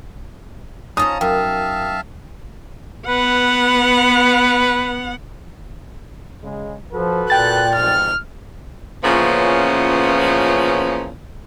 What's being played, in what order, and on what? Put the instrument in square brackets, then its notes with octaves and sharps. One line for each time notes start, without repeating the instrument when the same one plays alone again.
[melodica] C#4 A5 A#5 [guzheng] D#4 F4 C5 [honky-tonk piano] D#6
[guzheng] F#2 [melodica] E5 F5 A5 [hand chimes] G5
[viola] B3 F#5 [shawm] B4
[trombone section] C#3 G#3
[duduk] F3 [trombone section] F#4 A4 B4
[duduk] A#2 [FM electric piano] G5 A6 [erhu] F#6
[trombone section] B1 F2 G#2 [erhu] F6
[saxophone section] A#2 C#3 E3 F3 B3 C#4